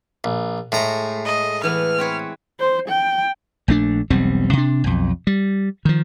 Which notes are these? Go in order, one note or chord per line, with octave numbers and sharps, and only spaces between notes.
A#1
A2 G#3 A3 A#5
D#5
E3 B3 F6
C4 B4 C#5
C5
G5
A#1 A3 D4
E1 B1 G3 C4
C3 D4
B1 F2
G3
D#3 F3